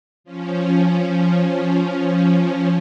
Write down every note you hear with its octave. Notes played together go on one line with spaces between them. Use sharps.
F3 C#4